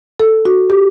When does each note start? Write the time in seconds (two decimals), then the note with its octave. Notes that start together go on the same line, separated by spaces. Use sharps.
0.20 A4
0.45 F#4
0.70 G4